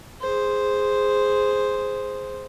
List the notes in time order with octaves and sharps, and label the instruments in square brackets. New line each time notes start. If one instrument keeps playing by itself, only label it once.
[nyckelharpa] G#4 C5